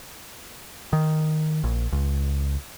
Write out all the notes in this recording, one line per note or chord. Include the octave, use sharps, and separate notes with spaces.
D#3
A#1
C#2